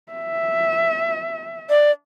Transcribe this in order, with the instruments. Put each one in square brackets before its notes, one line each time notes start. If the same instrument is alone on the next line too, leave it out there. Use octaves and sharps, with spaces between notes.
[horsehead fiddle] E5
[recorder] D5